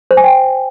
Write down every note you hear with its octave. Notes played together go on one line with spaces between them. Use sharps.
C5
G#5
G5